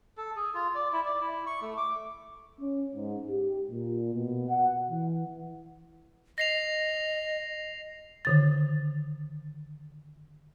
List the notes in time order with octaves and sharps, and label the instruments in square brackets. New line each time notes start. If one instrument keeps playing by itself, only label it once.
[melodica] A4
G#4
F4
D5
E4
D5
E4
C#6
A3
D6
[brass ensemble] C#4
G#2
G4
A#2
B2
F#5
E3
[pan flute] D#5 [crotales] A#6 C7 F7
[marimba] D3 D#3 A6